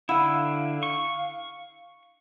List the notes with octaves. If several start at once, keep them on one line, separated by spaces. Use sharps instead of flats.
D3 E4 F5 F#5 B5 E6
C#6